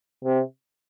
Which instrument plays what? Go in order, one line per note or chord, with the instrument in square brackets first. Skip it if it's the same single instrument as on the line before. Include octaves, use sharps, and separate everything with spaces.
[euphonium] C3